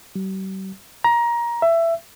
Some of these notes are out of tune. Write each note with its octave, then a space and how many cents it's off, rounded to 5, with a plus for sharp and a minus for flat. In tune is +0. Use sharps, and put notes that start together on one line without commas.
G3 -45
A#5 +20
E5 +15